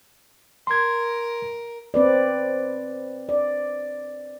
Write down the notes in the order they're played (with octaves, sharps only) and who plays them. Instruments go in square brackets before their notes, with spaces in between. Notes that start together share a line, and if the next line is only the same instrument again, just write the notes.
[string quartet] A#4 [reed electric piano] C6 G#6
[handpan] C4 B4 D5
D5